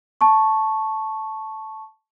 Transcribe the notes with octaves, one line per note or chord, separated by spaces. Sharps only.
A5 C#6